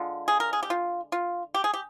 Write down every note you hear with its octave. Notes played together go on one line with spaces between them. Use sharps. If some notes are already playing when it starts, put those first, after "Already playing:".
Already playing: D3 G#3 F4
G#4
A#4
G#4
G4
F4
F4
G4
G#4
G4